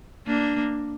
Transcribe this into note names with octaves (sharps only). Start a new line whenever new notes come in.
A#3 D4